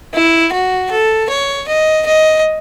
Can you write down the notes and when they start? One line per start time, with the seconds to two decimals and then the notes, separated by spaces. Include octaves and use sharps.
0.14 E4
0.53 F#4
0.91 A4
1.30 C#5
1.68 D#5
2.07 D#5